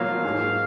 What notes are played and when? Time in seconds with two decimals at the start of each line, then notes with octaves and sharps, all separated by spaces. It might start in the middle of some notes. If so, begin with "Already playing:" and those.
Already playing: B2 F#3 A#3 F4 F5
0.24 G#2